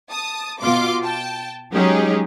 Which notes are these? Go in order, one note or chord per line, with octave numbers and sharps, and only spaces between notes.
A5 D#6
B2 F4 C6 D6
G5 A5
F#3 G#3 C#4 D#4 G4 G#4